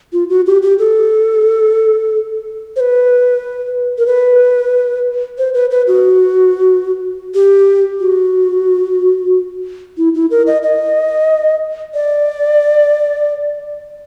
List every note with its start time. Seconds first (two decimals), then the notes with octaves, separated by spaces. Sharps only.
0.13 F4
0.29 F#4
0.46 G4
0.62 G4
0.79 A4
2.76 C5
2.80 B4
3.98 A#4
4.07 B4
5.38 C5
5.54 B4
5.71 B4
5.87 F#4
7.35 G4
8.00 F#4
9.98 E4
10.14 E4
10.31 A#4
10.47 D#5
10.63 D#5
11.95 D5